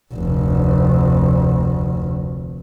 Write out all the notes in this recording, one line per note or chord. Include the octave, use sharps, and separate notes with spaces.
F1 D2